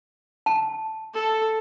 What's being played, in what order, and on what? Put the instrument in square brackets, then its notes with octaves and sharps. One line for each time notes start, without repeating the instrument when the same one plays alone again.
[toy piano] A5
[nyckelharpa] A4